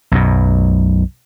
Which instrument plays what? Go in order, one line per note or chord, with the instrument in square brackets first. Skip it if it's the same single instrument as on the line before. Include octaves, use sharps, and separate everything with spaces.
[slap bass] B1 F#2 B2